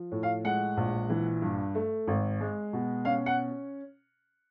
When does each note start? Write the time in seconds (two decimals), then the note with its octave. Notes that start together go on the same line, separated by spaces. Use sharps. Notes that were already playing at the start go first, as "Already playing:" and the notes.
Already playing: F3
0.12 A2
0.23 F5
0.44 G#3 F#5
0.77 A#1
1.10 E3
1.42 G2
1.75 A3
2.07 G#1
2.41 G#3
2.73 B2
3.05 C#4 F5
3.26 F#5